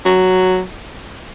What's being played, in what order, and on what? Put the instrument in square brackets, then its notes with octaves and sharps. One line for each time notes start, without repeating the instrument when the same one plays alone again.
[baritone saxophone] F#3